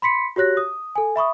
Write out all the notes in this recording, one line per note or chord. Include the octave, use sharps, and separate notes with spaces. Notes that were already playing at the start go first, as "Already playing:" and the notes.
B5 C6 B6 C#7
F#4 G4 C#5 F#6 A#6
D#6
A4 G#5
E5 B5 C#6 D#6